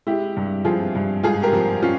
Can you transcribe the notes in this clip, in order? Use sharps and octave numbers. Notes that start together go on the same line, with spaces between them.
G#3 E4 G4
G2
F3 F4 G#4
G2
G#2 F4 G#4
G4 A#4
F3
C#4 F4